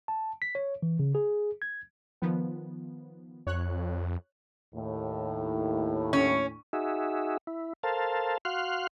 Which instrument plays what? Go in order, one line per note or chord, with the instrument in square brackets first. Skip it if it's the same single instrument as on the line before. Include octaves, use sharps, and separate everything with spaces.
[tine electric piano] A5
B6
C#5
E3
C#3
G#4
G#6
[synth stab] D#3 F3 B3
[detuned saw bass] F2 [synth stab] C#5 F#6
[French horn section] D#2 A2
[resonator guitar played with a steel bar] C#4
[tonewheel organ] D#4 F#4 G#4 E5
E4
A4 A#4 C5 F5 A5
F#4 F5 C6 F6 F#6